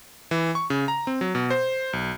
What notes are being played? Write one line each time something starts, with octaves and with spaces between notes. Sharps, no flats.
E3
C#6
C#3
A#5
C4
F#3
B2
C5
B1